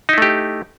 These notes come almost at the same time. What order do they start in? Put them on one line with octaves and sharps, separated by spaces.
D#4 E4 A3 G4